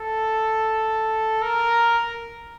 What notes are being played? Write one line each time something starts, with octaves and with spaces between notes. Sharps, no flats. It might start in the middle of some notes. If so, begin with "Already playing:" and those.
Already playing: A4
A#4